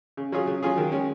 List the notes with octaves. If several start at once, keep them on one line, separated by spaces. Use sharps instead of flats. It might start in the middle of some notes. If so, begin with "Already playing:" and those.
C#3
F#3 C#4 F4 G#4
C#3
F#3 C#4 F4 G#4
D#3
G#3 C#4